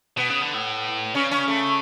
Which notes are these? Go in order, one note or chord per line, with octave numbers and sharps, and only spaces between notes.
B2 B3
C#3
D3
A2
C#3 C#4
C#4
A3